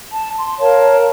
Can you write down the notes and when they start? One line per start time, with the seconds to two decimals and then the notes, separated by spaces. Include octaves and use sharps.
0.12 A5
0.38 C6
0.59 A#4 C#5 F5 A5